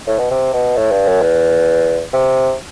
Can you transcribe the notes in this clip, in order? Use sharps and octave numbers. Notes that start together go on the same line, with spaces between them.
A2
B2
C3
B2
A2
G2
F#2
E2
C3